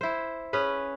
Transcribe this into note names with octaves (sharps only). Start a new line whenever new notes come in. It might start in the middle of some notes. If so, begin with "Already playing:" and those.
E4 C5
C#4 G#4 B4